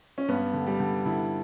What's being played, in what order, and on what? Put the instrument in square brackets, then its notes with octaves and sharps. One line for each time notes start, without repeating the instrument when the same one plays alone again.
[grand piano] C#4
G2 B3
D3
G3
D3
D3 E4